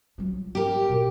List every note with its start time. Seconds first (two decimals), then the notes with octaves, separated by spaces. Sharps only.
0.18 F#3 F4
0.55 G4 A#4
0.89 B2